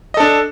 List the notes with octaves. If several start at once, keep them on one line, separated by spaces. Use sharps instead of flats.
D4 A4 D#5